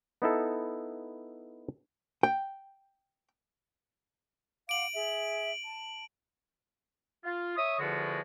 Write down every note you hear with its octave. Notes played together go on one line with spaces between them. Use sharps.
B3 D#4 E4 A4
G5
F5 F#5 D6 D7 F#7
G#4 E5
A5
F4
C#5 E5 C#6 D#6
E2 D3 F3 G#3 F4 F#4